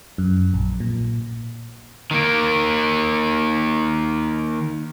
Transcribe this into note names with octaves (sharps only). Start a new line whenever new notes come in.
F#2
A#1
A#2
D#3 A#3